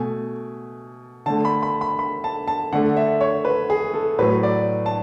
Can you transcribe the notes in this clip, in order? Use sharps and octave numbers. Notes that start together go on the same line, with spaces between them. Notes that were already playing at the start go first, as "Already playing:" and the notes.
Already playing: B2 A3 G#5
D3 A3 A5
B5
B5
B5
B5
A5
A5
D3 A3 F#5
E5
C#5
B4
G#4
A4
A2 F#3 A3 B4
D5
A5